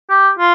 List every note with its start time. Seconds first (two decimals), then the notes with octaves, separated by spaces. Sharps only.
0.10 G4
0.39 F4